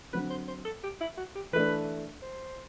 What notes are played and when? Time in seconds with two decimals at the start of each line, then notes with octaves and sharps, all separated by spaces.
0.13 D3 F#3 C4 B4
0.30 C5
0.48 C5
0.65 A4
0.84 G4
1.01 E4
1.17 F#4
1.35 G4
1.53 E3 A3 D4 B4
2.22 C5